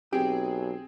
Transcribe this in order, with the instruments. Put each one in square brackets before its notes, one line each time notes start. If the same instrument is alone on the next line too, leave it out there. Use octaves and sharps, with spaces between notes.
[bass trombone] B1 [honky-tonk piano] C4 G#4 [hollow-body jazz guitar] G4